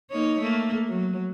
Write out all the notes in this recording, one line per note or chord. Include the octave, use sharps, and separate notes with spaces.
A#3 D#4 C#5
A3 A#3
F#3